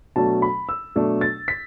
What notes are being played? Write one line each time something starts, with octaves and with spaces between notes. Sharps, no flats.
B2 F#3 A3 D4 A5
B5
E6
B2 F#3 A3 D4
A6
B6